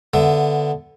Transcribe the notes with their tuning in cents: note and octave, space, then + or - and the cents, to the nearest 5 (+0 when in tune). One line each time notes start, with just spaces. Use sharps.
D3 +0 B3 +0 E5 +0